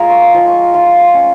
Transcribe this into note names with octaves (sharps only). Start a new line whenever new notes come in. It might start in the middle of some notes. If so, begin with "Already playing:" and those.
Already playing: G#3 F4 F5 G#5 A#5
C#6
C6
F3
C#6
F4 C6
C6
C#4